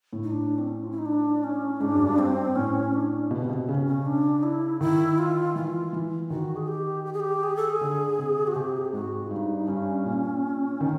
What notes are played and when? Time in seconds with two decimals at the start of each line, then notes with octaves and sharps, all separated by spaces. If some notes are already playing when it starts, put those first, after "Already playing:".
0.13 A2
0.23 D#4
0.31 D4
0.58 C4
0.69 C#4
0.83 F4
0.91 E4
0.98 D#4
1.06 D4
1.44 C#4
1.80 G#2 D4
1.95 F#2
2.06 G2
2.18 C4
2.55 A2 C#4
2.93 D4
3.31 B2 B3
3.40 C3
3.49 B2 C4
3.68 C#3 C#4
3.87 C#4
4.06 D4
4.43 E4
4.81 D#3 E4
5.18 F4
5.56 E3 F4
5.93 E3
6.30 D#3 F#4
6.56 G#4
6.68 G4
7.05 G4
7.13 G#4
7.20 G4
7.43 G#4
7.56 A4
7.70 G#4
7.81 D3
8.19 C3
8.47 F#4
8.55 C3 G4
8.76 G#4
8.85 G4
8.93 G#2 F#4
9.30 G2 D#4
9.67 G2 C#4
10.06 A#2
10.81 D#3